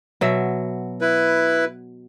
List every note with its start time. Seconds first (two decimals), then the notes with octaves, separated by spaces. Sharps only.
0.21 B2 F#3 E5
1.01 E4 B4